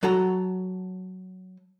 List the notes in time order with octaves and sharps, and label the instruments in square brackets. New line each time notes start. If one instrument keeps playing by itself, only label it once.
[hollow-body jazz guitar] F#3 A4 F#5 A#5